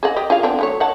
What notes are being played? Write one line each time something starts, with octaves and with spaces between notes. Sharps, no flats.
G#4 D#5 F#5
G4 D#5
F4 G#4 F5
B3 C4 D4
F#3 A3 C#5
C#5 F#5 A5